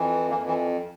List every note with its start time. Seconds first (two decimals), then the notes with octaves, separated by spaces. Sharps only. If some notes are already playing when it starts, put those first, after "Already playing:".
Already playing: F2 E3
0.30 F2 E3 A#3
0.47 E3